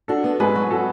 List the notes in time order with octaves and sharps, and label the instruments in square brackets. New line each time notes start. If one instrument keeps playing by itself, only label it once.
[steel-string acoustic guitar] D4 [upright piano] F#4 A4
[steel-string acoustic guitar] B3
[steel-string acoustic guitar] G#2 [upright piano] G#4 B4
[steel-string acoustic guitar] F#3
[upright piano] F#4 A4